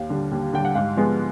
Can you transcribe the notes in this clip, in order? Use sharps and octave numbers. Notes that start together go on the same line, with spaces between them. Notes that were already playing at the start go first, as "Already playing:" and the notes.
Already playing: D#2 F5
D3 G3
D#2
D3 G3 G5
F#5
G#2 F5
F3 G#3 B3